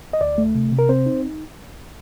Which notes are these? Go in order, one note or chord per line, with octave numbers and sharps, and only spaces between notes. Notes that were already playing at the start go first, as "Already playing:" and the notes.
D#5
D2 D5
A3
C3
C3
A#4
C4 C5
D#4